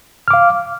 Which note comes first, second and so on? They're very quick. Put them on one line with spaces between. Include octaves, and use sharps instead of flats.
F6 D6 F5